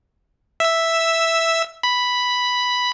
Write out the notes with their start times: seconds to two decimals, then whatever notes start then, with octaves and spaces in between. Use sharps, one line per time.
0.60 E5 E6
1.83 B5